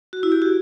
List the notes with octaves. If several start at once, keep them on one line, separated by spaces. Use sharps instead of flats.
F#4
E4
G4
F#4